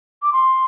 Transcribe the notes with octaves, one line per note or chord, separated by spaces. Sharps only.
D6
C6